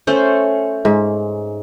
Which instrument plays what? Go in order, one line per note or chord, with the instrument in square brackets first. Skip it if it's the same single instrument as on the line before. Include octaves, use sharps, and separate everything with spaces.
[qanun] A3 C#4 C5
[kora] G#2